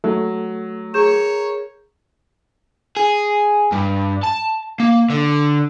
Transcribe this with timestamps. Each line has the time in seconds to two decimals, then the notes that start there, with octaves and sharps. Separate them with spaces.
0.04 F#3 A3
0.94 G#4 A#4 C#5 G6 E7
2.96 G#4
3.72 G2
4.24 A5
4.80 A#3
5.10 D3